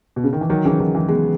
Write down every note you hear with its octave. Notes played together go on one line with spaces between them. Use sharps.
B2
C#3
D#3
E3
D#3 F#3
C#3 E3
D#3 F#3
E3 G#3
G#3 B3